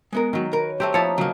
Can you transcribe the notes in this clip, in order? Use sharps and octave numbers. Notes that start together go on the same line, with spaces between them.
G#3 B3 A#4
D#3 F#3
A#4 B4 C#5
A3 C4 G4 A#4 C5
F3 A#3 D#4 E4 C#5 E5 A5 D#6
C#3 F#3 A#3 D#5 A5